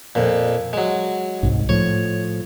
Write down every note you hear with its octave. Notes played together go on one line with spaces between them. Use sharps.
F2 A#2
F#3 G#3
C2 G#2
A2 F3 C#5